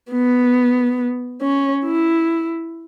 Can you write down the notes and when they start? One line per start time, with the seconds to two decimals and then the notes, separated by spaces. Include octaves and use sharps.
0.11 B3
1.41 C#4
1.85 E4